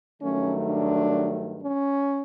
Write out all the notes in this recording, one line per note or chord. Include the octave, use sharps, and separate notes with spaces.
G2 D#3 F#3 A3 C#4
D4
C#4